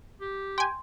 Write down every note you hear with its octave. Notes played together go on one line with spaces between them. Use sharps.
G4
G5 G#5 C6